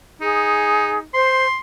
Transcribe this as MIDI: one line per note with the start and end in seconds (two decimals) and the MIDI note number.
0.21 1.05 63
0.21 0.98 68
1.14 1.46 72
1.14 1.59 84